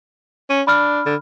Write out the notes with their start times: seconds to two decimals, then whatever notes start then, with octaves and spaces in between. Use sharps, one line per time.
0.50 C#4
0.67 D4 B5 F6
1.06 D3